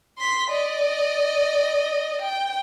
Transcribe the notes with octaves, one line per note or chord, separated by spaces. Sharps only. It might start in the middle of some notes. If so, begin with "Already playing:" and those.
C6 B6
D5 D#5
G5